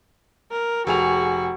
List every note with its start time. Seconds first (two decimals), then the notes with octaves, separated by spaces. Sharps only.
0.51 A#4
0.87 F1 F#4 G#4 F7